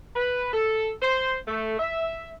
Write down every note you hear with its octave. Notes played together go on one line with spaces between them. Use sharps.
B4
A4
C5
A3
E5